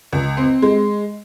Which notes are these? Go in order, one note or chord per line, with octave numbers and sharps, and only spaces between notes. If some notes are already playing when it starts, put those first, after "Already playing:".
C#2
C4
G#3